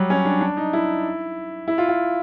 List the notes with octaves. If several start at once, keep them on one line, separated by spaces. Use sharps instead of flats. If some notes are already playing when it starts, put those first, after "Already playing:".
Already playing: F#3 G3
C#4
D4
D4
D#4
E4
E4
F4
F4